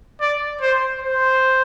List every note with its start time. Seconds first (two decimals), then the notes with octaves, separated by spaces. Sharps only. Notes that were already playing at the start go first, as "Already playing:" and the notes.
0.21 D5
0.61 C5
1.02 C5